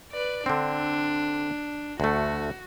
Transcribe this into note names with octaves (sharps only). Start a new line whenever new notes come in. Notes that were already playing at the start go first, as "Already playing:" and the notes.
B4 D5
D3 C4 D4
D2 A3 F#4